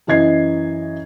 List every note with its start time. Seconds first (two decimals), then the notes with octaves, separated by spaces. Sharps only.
0.07 F#2 E3 D#5 G#6 C7